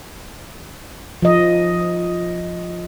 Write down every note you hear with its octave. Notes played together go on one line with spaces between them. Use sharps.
F3 D#5